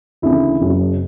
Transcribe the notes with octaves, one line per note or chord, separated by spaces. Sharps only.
D2 C#3 E3 E4
F#1 F#2 C#3